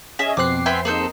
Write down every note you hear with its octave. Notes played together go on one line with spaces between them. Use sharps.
C#4 G#4 D#5 E5
F2 B2 C4 D6 F#6 C7
B3 G4 E5 G#5 C6
A#3 D#4 G#4 A4 C5